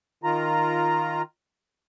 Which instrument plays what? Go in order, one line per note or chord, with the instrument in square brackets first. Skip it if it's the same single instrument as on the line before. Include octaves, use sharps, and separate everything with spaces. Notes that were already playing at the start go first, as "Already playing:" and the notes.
[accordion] D#3 F4 A#5